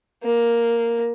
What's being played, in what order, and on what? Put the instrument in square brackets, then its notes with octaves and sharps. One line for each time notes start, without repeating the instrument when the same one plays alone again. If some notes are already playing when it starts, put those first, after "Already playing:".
[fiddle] A#3